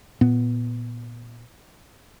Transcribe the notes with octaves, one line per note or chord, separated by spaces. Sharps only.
A#2 B3